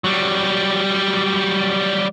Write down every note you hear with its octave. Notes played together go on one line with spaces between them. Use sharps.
F#3 G3